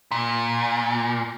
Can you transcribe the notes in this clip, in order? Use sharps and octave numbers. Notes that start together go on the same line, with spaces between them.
A#2